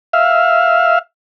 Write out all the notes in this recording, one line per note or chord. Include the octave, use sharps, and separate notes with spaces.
E5 F5